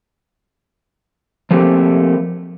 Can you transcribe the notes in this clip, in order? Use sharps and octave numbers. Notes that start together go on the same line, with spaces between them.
F3 A3 A#3 C4 G4